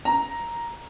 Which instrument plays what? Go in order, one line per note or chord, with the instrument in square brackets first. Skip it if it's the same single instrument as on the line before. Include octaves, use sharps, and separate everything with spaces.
[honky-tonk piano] A#5